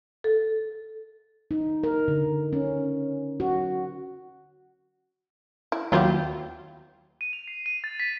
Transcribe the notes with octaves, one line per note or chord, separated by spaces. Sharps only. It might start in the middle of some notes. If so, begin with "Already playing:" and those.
A4
D#4
A#4
D3
C#4
F#4
E4
D#2 F#3 B3 E4 F4 G4
D#7
F7
C7
D#7
A6
B6